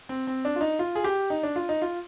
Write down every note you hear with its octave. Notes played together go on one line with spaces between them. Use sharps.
C4
C4
D4
F4
D#4
F4
G#4
G4
D#4
D4
F4
D#4
F4